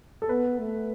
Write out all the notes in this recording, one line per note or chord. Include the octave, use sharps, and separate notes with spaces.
A4
B3 B4
A3